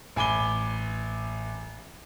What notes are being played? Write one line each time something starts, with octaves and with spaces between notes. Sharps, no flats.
A1 G#5 B5 D6 G7